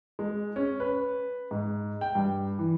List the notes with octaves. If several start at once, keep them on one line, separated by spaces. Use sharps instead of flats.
G#3
C#4
B4
G#2
G5
G2
E3